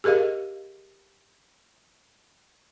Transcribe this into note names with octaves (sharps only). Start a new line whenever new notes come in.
G4 G#4 A#4 D#5 F5